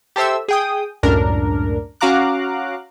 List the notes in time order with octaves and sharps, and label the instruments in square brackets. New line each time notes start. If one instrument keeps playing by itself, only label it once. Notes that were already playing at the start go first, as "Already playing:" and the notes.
[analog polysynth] G4 A4 C5 E5 E6
G#4 G5 D#6
C#2 F#2 A2 D4 A#4
C#4 F#4 F5 A#5 D6 F#6